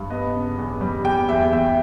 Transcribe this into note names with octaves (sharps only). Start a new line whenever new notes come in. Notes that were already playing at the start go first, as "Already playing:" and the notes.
Already playing: G2
B3 D#5
C#3
E2
G3
E2 G5
E2 E5
E2 E5